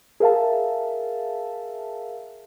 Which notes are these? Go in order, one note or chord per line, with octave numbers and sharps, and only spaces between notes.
G#4 A#4 E5 F5 A5